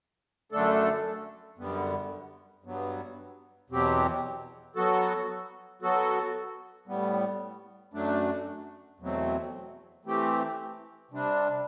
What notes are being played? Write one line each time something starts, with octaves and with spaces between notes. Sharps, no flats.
F#2 D3 A3 D4 A4
F#2 D3 G3 B3
G2 F#3 B3
E2 B2 F#3 C4 G4
F#3 B3 F#4 A4
F#3 B3 F#4 A4
A2 G3 B3
F#2 F#3 A3 D4
E2 B2 F#3 A3 C4
E3 A3 C4 G4
C3 G3 D4